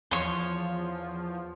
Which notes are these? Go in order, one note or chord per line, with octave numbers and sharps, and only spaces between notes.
E2 F3 C#5 C6